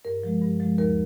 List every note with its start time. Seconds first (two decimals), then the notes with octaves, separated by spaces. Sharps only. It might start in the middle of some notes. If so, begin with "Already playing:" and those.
0.05 G2 A#4
0.23 F3 G#3
0.42 G2
0.60 F3 G#3
0.78 D#2 A#4